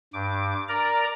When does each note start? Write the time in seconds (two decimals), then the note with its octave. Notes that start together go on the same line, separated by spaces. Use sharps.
0.13 G2 D6
0.69 A#4 D5 A#5